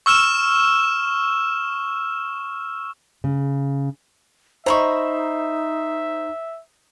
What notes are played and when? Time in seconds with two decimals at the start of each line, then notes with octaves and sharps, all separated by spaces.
0.06 C#6 E6 F6 E7
3.24 C#3
4.66 D#4 C5 D#5 E5 A#5 B5 C#6